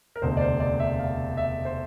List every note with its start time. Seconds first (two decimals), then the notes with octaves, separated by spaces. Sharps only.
0.16 A#4
0.22 E1 D2 C3 C5
0.37 D5
0.41 C5
0.60 D5
0.80 E5
0.99 F5
1.37 E5
1.65 C5